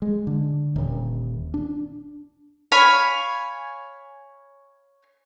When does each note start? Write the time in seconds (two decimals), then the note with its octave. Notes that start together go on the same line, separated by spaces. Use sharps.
0.02 G#3
0.27 D3
0.76 D#1
1.54 D4
2.72 C#5 F5 G#5 B5